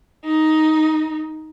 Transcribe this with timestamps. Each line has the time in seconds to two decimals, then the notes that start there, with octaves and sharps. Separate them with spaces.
0.24 D#4